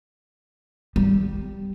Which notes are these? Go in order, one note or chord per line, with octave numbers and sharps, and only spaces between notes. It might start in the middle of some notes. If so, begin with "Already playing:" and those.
G3